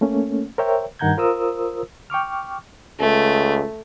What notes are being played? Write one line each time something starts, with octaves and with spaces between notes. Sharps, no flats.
A3 A#3 C#4
A#4 C5 C#5 E5 G5
G2 D#3 F#5 A#5 G6 G#6
F4 A#4 C5 D#6 E6
G5 C#6 D6 F6
C#2 A3